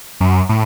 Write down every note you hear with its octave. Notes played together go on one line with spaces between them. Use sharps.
F#2
A2